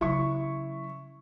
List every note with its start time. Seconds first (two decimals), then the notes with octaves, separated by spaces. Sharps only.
0.01 C#3 F#3 E4 C#6